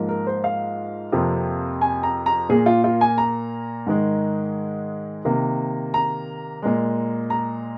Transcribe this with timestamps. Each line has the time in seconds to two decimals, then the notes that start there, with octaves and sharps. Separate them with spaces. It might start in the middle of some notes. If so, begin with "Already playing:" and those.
Already playing: G#2 F3 A#3
0.09 A#4
0.27 C5
0.44 F5
1.12 F2 C3 F3 A#3
1.81 G#5
2.03 A#5
2.26 A#5
2.49 A#2 A#3 G#4
2.66 F4
2.84 F4
3.01 G#5
3.18 A#5
3.86 G#2 D#3 G#3
5.25 C3 D#3 A#3
5.94 A#5
6.62 A#2 G#3
7.30 A#5